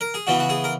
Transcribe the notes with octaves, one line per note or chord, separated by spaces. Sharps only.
A#4
G#4
C#3 E3 B3 F#4
F#4
G#4
A#4